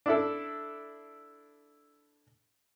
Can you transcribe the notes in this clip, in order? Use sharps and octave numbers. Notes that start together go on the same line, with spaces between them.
D4 E4 A4